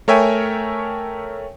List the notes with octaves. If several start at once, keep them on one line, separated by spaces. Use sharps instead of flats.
A3 A#4 C#5 E5 G5 G#5